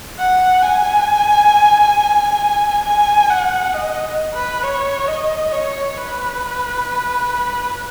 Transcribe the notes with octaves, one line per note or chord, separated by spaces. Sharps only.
F#5
G#5
G#5
F#5
D#5
B4
C#5
D#5
C#5
B4